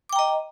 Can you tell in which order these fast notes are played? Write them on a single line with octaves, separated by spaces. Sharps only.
D6 G5 A#5 D#5